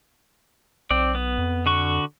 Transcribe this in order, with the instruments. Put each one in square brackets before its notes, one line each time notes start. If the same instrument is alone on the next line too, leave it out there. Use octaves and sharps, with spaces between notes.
[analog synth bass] B1 [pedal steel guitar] C4 D5
[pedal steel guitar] B3
[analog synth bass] F2
[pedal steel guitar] D3 F#4 C#6